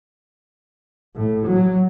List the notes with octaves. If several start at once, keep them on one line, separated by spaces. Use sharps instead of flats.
A2
F#3